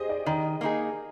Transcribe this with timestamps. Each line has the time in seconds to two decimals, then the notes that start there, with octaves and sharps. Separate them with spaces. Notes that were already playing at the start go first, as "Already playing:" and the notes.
Already playing: G4 G#4 C5 D#5
0.09 D5
0.26 D#3 D#5
0.61 A#3 D#4 G#4